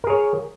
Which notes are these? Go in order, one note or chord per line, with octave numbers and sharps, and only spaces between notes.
G#4 A#4 C#5